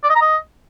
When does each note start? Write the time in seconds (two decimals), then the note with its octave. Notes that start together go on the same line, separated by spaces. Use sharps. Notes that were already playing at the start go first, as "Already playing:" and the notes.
0.04 D5
0.09 D#5
0.15 A#5
0.21 D#5